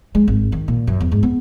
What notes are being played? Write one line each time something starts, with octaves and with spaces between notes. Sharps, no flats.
G#3
G#1
D#3
A#2
F#2
E2
G#2
B3